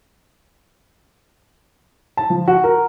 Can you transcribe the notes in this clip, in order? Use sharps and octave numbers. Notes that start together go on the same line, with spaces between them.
A5
F3
F#4
A#4